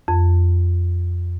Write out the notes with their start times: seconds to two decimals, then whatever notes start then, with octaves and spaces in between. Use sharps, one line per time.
0.08 F2